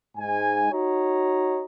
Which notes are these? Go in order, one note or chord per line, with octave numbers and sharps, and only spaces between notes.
G#2 G#5
D#4 F#4 C#5 D#5 A#5